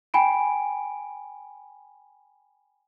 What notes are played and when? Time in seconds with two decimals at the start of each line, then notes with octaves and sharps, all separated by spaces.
0.14 G5 G#5 B5 D7